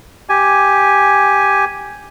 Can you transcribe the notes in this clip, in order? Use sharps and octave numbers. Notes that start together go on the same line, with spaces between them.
G4 G#5